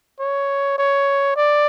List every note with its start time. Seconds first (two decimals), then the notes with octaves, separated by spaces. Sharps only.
0.19 C#5
0.78 C#5
1.36 D5